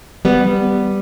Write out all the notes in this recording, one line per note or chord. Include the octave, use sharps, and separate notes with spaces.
G3 B3